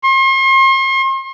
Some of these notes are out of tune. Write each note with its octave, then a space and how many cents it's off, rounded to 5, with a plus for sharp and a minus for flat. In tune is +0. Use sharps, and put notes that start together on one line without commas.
C6 +45